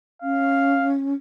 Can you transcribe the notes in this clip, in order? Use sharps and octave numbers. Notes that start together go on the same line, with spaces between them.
C#4 F5